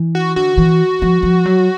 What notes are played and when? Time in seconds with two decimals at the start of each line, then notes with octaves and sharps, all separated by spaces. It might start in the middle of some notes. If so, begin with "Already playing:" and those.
Already playing: E3
0.15 F#4
0.36 D3 F#4
0.58 E3
1.02 F3
1.23 F3
1.46 F#3